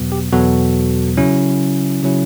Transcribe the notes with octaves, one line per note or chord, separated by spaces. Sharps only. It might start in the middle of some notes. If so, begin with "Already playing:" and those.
Already playing: E2 B2 F#3 B3
G4
E2 B2 F#3 B3 F#4 A4
C#3 F#3 C#4 E4
C#3 F#3 C#4 E4